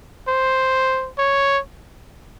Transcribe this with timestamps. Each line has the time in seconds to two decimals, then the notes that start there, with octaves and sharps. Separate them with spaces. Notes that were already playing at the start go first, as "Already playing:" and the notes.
0.28 C5
1.18 C#5